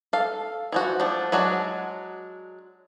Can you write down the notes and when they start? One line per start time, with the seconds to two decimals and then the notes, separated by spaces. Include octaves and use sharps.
0.13 A4 F5
0.72 E3 F3 F#4
1.00 F3 A3 D4
1.32 F#3 G#3 D4 F#4